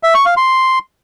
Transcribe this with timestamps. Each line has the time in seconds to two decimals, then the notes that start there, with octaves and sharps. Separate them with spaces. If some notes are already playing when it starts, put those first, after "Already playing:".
0.03 E5
0.15 C#6
0.26 F5
0.37 C6